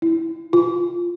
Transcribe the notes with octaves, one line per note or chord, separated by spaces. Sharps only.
E4
F4